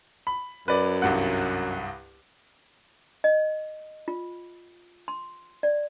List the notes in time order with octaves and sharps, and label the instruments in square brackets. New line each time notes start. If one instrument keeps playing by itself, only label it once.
[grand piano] B5
[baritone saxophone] F#2 [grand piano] B4 D5
[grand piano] C2 G2 F#5
[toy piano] D#5
F4
C6
D5